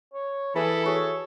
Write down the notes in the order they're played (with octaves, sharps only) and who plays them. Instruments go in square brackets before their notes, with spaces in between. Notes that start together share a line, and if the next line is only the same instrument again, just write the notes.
[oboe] C#5
[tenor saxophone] E3 [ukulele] G#4 [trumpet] A4 [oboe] B5
[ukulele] F#4 G#4 [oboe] C#5